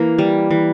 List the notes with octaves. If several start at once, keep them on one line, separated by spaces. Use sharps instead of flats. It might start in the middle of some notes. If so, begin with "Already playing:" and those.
Already playing: E3 A#3
G3
E3